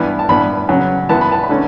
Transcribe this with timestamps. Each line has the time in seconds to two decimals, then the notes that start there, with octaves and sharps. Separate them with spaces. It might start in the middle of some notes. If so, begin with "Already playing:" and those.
Already playing: G2 E3 B3
0.19 A5
0.29 G2 E3 B3 B5
0.69 C#3 F#3 C#4
1.09 F#2 E3 B3 A5
1.21 B5
1.32 A5
1.43 B5
1.49 D3 A3 C#4